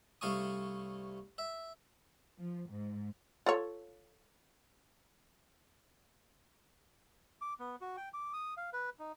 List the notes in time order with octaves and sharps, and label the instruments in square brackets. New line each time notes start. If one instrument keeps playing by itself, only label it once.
[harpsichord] C2 A3 F5 A5 C#6 D#6
E5
[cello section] F3
G#2
[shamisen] F4 A4 C#5
[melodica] D6
B3
F#4
G5
D6
D#6
F5
B4
D#4